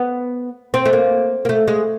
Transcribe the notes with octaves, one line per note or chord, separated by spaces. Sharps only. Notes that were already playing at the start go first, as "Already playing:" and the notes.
Already playing: B3
C4
A3
A#3
A#3
A3
G#3